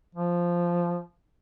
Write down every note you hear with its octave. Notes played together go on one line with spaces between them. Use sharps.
F3